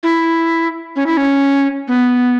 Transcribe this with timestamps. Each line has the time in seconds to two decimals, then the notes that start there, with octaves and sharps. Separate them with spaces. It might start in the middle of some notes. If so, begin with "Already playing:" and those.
0.03 E4
0.96 C#4
1.06 E4
1.17 C#4
1.88 B3